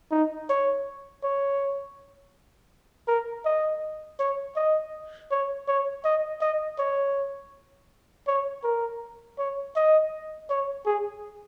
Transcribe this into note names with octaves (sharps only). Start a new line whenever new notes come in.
D#4
C#5
C#5
A#4
D#5
C#5
D#5
C#5
C#5
D#5
D#5
C#5
C#5
A#4
C#5
D#5
C#5
G#4